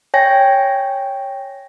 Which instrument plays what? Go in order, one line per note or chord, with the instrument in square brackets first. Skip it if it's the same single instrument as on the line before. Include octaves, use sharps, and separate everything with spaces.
[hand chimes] C#5 G5 G#5 A#6